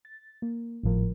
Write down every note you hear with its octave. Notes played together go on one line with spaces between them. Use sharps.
A6
A#3
G#1 A2 F3 A#4